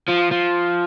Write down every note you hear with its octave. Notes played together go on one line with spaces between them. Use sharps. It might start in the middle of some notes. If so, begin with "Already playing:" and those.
F3
F3